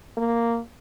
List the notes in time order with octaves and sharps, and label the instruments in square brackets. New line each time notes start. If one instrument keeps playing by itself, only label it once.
[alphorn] A#3